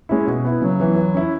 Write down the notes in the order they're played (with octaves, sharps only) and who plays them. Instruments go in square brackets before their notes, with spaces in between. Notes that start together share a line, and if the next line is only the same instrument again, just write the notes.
[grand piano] G#3 C#4 E4
B2
B3 E4
[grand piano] C#3 [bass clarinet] F#3
[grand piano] E3 B3 E4
E3
C#4 E4